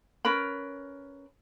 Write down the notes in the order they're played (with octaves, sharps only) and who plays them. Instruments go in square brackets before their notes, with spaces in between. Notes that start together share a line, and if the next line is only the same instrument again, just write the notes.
[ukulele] C#4 A#4 B4 B5